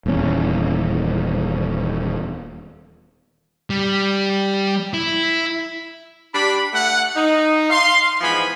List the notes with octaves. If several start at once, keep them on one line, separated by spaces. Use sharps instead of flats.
D#1 E2 G3 C#4
G3
E4
G3 D4 B5
A3 F#5
D#4
F5 C6
G#2 E3 F3 B3 G#5 B5